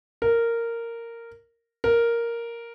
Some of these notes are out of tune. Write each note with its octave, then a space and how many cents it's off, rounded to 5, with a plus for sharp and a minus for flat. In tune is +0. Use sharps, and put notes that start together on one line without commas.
A#4 -10
A#4 +0